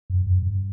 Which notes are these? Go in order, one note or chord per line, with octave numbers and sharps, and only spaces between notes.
F#2
F#2
G2